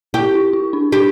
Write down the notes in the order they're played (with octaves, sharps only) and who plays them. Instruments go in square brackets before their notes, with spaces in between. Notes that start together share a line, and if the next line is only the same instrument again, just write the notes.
[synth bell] E4 [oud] G4
[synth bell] E4
E4
D4
[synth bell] D4 [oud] G4